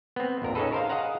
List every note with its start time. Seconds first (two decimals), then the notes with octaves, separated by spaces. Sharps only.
0.16 B3 C4
0.42 A#1 F2 A#4 A#5
0.55 C#4 D#4 F#4 G#4 A4 B4
0.72 A#4 C5 F5
0.89 G#4 D#5 F5 F#5 A#5